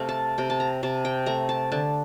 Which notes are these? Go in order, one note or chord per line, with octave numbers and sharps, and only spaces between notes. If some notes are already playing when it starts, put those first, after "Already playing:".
Already playing: C3 A3 F5
A5
C3 G5
A5
A#5
C3 A5
G5
A3 A#5
A5
D3 A5